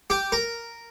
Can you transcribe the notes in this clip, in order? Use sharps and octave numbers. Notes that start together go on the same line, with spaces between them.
G4
A#4